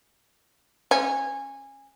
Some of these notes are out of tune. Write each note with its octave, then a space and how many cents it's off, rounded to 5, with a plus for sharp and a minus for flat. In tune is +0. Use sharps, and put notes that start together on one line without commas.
C#4 -20